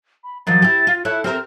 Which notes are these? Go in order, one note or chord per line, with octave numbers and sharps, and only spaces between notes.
B5
D#3 F3 F#3 A6
E4 G4
F4
E4 A4 C#5 F#6
C4 G4 A#4 F6